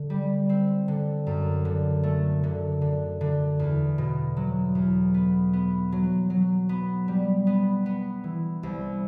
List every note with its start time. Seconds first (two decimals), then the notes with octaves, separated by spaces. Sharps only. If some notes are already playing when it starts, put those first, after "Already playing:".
Already playing: D3
0.10 G3
0.49 C4
0.88 D3
1.27 F#2
1.65 D3
2.03 A3
2.43 D3
2.81 D3
3.21 D3
3.59 E2
3.98 B2
4.37 F#3
4.75 E2
5.14 B3
5.53 B3
5.92 F#3
6.30 F#3
6.69 B3
7.08 G3
7.47 B3
7.86 B3
8.24 E3
8.63 C2